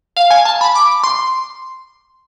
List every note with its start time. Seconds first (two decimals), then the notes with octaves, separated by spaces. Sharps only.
0.17 F5
0.31 G#5
0.45 A5
0.61 B5
0.75 D6
1.04 C6